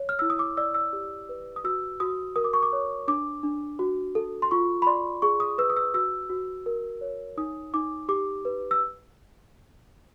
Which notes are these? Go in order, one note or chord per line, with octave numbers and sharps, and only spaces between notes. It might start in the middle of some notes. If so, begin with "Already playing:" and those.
Already playing: C#5
F6
E4 E6
D#6
D6
D5 E6
E6
G4
B4
D#6
F#4 E6
F#4 D#6
A#4 D#6
D6
C#6
D6
C#5
D4 D6
D4
F#4
A4
C6
F4 C#6
B5
D5 C6
G#4 C#6
D#6
B4 E6
D#6
E6
F#4 E6
F#4
A#4
C#5
D#4 D#6
D#4 D6
G4 D6
B4
E6